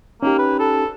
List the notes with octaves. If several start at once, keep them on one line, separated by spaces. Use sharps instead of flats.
A#3 C#4 D#4 G4
B4
A4